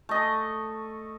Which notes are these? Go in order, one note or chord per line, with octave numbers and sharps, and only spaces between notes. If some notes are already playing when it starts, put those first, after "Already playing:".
A3 D#5